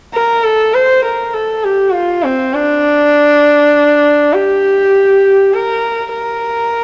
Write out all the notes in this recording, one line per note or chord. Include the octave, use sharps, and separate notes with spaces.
A#4
A4
C5
A#4
A4
G4
F4
C4
D4
G4
A#4
A#4